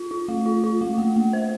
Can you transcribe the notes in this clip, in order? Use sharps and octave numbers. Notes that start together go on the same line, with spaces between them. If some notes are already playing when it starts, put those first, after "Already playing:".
Already playing: F4
F4
A3
F4
F4
A3
A#3
A#3
C5